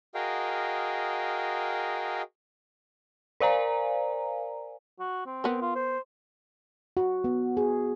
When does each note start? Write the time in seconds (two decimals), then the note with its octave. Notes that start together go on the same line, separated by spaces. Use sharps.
0.15 F#4 G#4 A#4 D#5 F5 G5
3.40 A#4 C5 D5 F5 G#5 A#5
4.99 F#4
5.26 C4
5.44 B3 A#4
5.61 F4
5.75 C5
6.97 F#4
7.24 B3
7.57 G#4